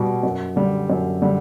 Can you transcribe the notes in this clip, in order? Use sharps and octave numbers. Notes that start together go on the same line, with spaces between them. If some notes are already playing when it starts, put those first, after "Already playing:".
Already playing: B2 G3
F#2
D3 G3
F#2
D3 G3